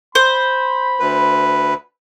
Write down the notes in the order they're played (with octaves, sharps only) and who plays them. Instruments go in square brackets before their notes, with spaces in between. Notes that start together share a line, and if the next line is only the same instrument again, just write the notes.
[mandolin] C5 [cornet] B5
[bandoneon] D2 B4